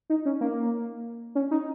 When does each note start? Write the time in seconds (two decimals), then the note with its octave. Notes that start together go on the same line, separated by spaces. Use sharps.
0.10 D#4
0.26 C#4
0.41 A#3
1.35 C#4
1.51 D#4